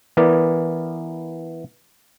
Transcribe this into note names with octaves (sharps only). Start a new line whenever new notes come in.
E3 B3 A#4 D5